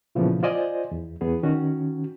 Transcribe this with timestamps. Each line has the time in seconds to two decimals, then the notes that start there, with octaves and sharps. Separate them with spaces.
0.15 A#2 C#3 E3 F3 A3 B3
0.43 F4 C5 D5 D#5 G#5
0.91 E2
1.21 E2 B3 G#4
1.43 D#3 C#4 F#4